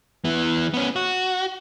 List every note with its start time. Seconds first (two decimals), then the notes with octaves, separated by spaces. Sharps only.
0.25 E3 B3
0.74 B3 C#4
0.96 F#4